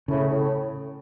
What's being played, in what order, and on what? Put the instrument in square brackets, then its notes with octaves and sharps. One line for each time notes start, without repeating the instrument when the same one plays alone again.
[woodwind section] A2 [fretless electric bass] C#3
[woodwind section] A2